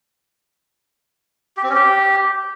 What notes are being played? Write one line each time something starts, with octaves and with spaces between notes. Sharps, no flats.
G4
C4
C#4
G4